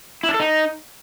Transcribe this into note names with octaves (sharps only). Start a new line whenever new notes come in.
E4
D4
A4
D#4